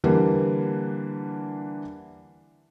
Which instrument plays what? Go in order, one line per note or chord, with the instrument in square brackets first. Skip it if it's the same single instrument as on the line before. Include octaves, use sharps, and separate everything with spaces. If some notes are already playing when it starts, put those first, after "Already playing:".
[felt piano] D3 E3 G3 A#3